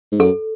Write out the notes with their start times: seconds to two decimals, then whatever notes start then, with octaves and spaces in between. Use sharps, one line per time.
0.12 G#2
0.20 F#2 A4